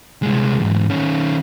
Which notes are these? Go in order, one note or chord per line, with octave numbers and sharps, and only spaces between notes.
C2 G#3
E2 G#2
D#3 C#4